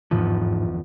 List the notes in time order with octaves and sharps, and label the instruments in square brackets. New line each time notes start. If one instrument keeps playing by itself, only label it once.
[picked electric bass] G1 E2 F3 [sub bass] G#2